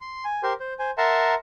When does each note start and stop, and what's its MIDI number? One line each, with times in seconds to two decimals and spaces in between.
0.01 0.24 84
0.25 0.42 80
0.43 0.53 67
0.43 0.53 70
0.43 0.53 72
0.43 0.53 84
0.60 0.74 72
0.79 0.91 72
0.79 0.91 80
0.98 1.35 70
0.98 1.35 76
0.98 1.35 78
0.98 1.35 81
0.98 1.35 82
0.98 1.35 84